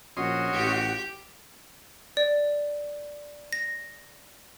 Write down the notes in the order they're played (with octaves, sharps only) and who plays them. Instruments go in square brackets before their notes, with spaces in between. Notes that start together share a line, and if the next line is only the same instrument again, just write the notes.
[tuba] A#1 [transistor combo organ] C#4 D#5 C6 [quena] F#4
[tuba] A1 [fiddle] G4
[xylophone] D5
A#6